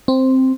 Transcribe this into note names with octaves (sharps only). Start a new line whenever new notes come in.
C4